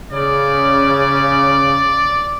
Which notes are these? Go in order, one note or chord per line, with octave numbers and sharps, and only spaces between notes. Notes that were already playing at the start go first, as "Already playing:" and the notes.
C#3 D5